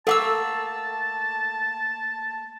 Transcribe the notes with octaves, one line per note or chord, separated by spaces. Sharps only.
A3 A#3 A4 F#5 A5 E6